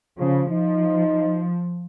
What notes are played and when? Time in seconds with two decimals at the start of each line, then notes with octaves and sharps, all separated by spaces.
0.19 C#3 F3
0.51 F3 D#4